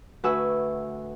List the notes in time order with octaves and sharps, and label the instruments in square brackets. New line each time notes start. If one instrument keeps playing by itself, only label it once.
[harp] D2 F#4 B4 G#5 E6